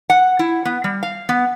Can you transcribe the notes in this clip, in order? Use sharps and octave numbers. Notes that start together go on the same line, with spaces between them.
F#5
E4
B3
G3
F5
B3